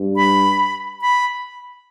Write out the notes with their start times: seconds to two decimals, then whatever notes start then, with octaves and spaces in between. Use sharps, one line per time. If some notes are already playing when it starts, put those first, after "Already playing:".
Already playing: G2
0.16 B5
1.01 B5